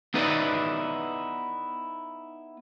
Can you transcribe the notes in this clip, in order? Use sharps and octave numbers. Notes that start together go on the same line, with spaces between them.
B3 D#4 E4 B4 D5 D#5